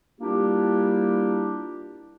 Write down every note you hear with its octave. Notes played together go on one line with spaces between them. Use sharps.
G3 A#3 D4 E4 F4 G4